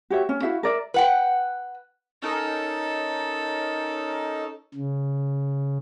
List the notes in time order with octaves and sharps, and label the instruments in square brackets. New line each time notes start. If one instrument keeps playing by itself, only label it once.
[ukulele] F#4 G4 C#5 E5
C#4
E4 F#4 E5 F5
A#4 D5 E5
[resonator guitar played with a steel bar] B4 F#5 G5
[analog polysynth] C#4 D#4 A#4 [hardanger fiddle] A4
[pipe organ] C#3